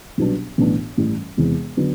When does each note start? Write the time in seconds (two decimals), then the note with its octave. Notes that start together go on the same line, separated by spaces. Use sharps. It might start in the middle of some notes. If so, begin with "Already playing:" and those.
0.18 C2 B2 F#3 B3 D4
0.58 B1 A2 E3 B3 D4
0.97 A1 G2 E3 G3
1.37 E1 E2 C3 E3
1.77 D3 F#3 B3